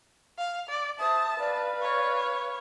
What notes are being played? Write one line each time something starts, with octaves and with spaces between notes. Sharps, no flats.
F5
D5
C5 E5 A5 D#6
B4 D5 F5
C#5